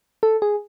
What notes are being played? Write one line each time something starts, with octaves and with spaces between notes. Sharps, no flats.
A4
G#4